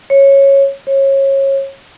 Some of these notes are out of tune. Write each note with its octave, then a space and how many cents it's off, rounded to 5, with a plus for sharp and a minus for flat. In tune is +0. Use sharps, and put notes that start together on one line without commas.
C#5 -10
C#5 -25